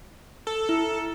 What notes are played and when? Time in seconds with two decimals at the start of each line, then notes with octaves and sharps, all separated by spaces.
0.47 A4
0.69 E4